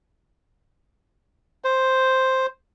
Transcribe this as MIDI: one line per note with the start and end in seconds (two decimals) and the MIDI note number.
1.64 2.46 72